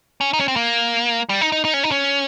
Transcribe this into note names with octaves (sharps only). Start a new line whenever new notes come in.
C#4
D#4
C#4
C4
A#3
G3
D#4
D#4
D#4
C#4
D#4
C#4